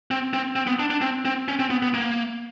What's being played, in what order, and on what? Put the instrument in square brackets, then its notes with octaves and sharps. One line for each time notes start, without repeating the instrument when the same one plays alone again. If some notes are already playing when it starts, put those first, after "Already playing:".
[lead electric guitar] C4
C4
C4
B3
D4
D4
C4
C4
C#4
C4
B3
B3
A#3